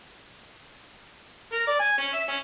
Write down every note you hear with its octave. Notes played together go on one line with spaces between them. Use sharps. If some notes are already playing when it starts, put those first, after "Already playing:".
A#4
D5
G#5
C#4
E5
C#4